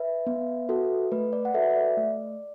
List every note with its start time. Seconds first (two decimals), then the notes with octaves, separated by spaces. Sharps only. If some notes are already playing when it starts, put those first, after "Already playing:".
Already playing: B4 E5
0.27 B3
0.69 F#4 A4
1.12 A3 B4
1.33 D5
1.45 F#5
1.54 F#4 A4 B4 E5
1.70 E5
1.76 D5
1.97 A3